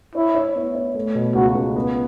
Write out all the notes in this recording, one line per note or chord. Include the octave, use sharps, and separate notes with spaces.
E4 C#5
C#5
B3
C#5
A3
B2
C#2 F#4
C#2
B3